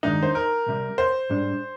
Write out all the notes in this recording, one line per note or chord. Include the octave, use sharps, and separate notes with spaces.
G2 D#3 G#3 D4 D#4
C5
A#4
C2 C3 G3
C5
G#2 G3 D4